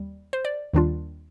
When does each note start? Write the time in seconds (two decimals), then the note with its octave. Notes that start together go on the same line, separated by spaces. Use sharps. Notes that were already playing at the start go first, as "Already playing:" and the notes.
Already playing: D#2 G3
0.33 C5
0.45 D5
0.73 D#2 D#3 G3 D4 F4